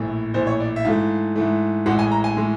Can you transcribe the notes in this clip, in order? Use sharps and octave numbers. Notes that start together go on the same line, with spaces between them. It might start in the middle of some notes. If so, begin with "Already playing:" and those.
Already playing: A#1 A2 E3
A#1 A2 E3 C5
C#5
D5
E5
G#2 E3 A3 F5
G#2 E3 A3
A1 A2 E3 G#3 F#5
G#5
A#5
G#5
A2 E3 G#3